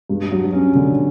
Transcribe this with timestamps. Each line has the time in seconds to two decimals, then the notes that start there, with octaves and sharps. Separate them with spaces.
0.09 G2
0.31 F#3
0.53 C#4
0.75 D3